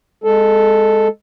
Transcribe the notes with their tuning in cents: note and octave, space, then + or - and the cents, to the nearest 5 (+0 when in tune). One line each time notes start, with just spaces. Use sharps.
G#3 -10 A4 +0